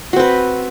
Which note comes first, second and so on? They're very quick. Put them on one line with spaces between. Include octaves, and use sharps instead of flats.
F#4 C4 B4